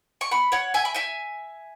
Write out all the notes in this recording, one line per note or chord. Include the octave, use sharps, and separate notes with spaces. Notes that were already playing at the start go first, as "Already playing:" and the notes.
C#6
F#5 B5
C#5 F#5
E5 G#5
B5
E5 G#5